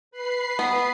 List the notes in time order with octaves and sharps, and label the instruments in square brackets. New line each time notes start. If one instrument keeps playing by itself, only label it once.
[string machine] B4 B5 C7
[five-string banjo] B3